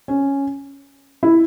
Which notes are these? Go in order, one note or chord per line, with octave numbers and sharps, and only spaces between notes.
C#4
E4